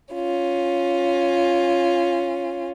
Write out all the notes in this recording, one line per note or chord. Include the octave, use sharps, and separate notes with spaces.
C#4 F4